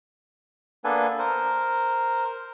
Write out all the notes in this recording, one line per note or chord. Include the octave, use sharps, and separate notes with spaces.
A#3 B3 D4 A4 B4 G#5
A#4 C5